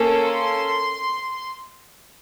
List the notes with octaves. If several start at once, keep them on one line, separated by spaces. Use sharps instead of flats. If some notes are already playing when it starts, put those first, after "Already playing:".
Already playing: A#3 C#4 A4
C6